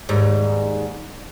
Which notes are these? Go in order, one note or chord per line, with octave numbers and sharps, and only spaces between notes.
D#2 G#2 G3